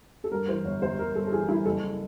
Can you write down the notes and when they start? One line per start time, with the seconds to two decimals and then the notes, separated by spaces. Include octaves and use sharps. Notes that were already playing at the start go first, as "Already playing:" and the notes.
0.24 A4
0.32 G2 A#4
0.48 E3 C5
0.64 G1 C#5
0.82 G1 C5
0.99 G1 A#4
1.15 G2 A4
1.27 A4
1.32 E3 G#4
1.48 G2 E4
1.65 F#1 A4